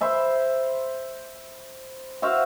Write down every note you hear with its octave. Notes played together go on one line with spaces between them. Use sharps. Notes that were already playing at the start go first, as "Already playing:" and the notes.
C5 E5 B5
F#4 C5 E5 F5